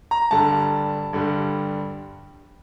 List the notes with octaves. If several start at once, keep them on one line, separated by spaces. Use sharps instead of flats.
A#5
G2 D3 G3 A5
G2 D3 G3